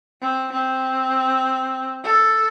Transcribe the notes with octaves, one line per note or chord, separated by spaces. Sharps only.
C4
C4
A4